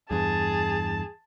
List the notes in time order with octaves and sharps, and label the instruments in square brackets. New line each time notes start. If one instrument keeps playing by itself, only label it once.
[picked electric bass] E2 G2 [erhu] G#4 [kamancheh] A5